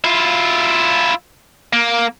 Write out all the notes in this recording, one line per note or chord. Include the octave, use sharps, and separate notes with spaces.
E4 F4
A#3